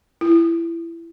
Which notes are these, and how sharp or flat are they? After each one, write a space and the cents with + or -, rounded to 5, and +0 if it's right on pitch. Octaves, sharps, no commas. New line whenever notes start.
E4 +25